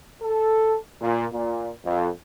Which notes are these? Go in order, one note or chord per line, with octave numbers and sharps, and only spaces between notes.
A4
A#2
A#2
F2